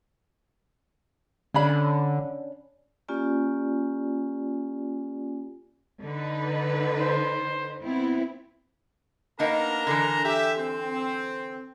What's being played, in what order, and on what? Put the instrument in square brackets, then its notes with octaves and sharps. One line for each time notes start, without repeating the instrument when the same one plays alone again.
[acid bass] D3 [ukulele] C#4 D4 B5
[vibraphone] A#3 C#4 F4 G4 D5 G#5
[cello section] D3 D#4 B4
[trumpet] C5
[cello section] B3 C4 E4
[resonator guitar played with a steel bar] A#3 B3 D#4 [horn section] D4 A#4 A#5
[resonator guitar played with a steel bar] D3 E3
[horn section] G4 E5
C4